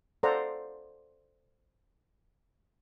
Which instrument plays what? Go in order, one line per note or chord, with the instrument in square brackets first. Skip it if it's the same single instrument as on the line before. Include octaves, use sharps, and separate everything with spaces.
[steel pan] A4 C5 D5 F5 F#5 A#5